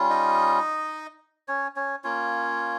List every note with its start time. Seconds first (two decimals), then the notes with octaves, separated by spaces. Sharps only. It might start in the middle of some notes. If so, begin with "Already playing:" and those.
Already playing: G3 C#4 F4
0.10 D#4 D#5
1.48 C#4 C#5
1.76 C#4 C#5
2.04 A#3 C#4 F4 C#5